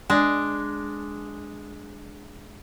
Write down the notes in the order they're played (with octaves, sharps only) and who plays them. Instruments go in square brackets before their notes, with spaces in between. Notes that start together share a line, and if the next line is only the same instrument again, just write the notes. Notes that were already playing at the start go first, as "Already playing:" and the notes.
[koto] G#3 D4